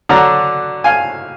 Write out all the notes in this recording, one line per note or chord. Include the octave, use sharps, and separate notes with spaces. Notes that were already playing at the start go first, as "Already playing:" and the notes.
D3 F#3 D4 F#5 A#5
F5 G#5